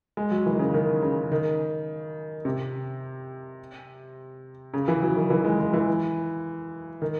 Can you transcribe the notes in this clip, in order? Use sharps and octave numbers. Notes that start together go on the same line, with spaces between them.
G#3
F#3
E3
D#3
C#3
D#3
C#3
D#3
C3
C#3
E3
F#3
D#3
E3
G#3
G#3
E3
D#3